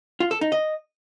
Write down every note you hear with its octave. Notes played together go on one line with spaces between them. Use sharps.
F4
A4
D#4
D#5